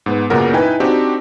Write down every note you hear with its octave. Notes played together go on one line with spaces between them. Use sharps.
G#2 B3
F#2 A#2 C#3 B3 A#4 F#5
D#4 E4 B4 G5 G#5
C4 D4 D#4 F#4 G4